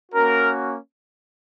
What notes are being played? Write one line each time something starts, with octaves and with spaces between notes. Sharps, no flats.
A#3 C#4 F#4 A#4